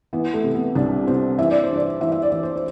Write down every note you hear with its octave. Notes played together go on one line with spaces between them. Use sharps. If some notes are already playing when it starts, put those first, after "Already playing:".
E3 B3
A3
C3
B3
C2 D4
C3 C5
E3 E5
D5
C5
G2
D5
E3 E5
E5
D5
E3
C5
C5